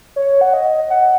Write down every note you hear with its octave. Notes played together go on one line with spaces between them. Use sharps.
C#5
F#5
D#5
F#5